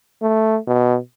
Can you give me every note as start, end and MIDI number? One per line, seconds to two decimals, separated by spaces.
0.22 0.58 57
0.67 0.98 47